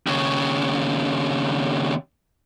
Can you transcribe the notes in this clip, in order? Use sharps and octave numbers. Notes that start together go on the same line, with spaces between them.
D#2 C#3